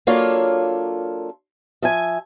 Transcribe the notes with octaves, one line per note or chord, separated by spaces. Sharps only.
F#3 A#3 D4 F4 A4 C#5
F3 E5 G#5